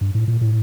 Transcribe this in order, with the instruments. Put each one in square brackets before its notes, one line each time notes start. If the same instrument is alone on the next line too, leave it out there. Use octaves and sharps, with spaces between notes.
[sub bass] G2
A2
A#2
A2